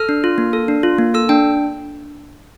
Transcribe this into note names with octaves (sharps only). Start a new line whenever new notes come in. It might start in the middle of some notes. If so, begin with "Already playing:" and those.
Already playing: A4 F6
D4
F4
A#3
A4
D4
F4
A#3
A4 E6
D4 G5